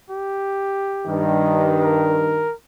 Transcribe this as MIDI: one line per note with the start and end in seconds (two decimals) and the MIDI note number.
0.10 1.24 67
1.08 2.47 43
1.08 2.47 51
1.82 2.54 70